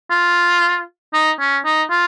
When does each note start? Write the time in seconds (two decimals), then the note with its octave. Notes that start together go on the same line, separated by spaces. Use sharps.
0.11 F4
1.14 D#4
1.40 C#4
1.65 D#4
1.90 F4